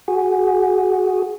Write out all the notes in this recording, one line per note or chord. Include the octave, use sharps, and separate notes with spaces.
F#4 G#4